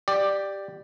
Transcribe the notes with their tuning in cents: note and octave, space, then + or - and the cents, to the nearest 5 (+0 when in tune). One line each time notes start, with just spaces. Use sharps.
G4 +0 D5 +10